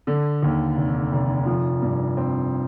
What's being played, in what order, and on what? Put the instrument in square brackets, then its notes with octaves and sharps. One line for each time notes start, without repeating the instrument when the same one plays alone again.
[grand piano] D3
D#2
F1
F1
F3
G2
C4